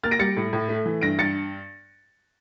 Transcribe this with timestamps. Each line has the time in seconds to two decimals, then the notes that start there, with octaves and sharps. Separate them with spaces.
0.03 A#3 F6 A6
0.11 A#6 D7
0.19 G3 A6 C#7
0.37 A2
0.53 A2
0.69 A3
0.86 E3
1.01 G2 A#6 D7
1.19 G2 A6 C#7